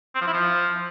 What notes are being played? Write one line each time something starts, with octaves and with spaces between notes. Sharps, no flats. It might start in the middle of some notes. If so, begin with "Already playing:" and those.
C4
F3
E4
F3